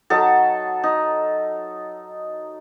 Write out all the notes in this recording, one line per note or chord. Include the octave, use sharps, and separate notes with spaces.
F#3 D#4 A4
D#4